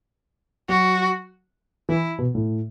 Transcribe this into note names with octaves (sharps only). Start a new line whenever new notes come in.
F#3 F#4
E3 E4
B2
A2